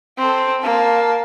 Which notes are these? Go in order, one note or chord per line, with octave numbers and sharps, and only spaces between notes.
C4 A4
A#3 A5